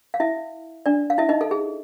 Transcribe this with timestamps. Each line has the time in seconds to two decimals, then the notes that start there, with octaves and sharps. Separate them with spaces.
0.14 F5
0.20 E4 E5
0.86 D4 D5
1.10 F5
1.18 E4 E5
1.29 D#4 D#5
1.41 A4
1.51 G#4